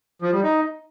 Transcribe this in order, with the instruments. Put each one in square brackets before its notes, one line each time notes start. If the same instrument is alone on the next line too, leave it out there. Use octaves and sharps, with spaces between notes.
[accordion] F3
G3
D#4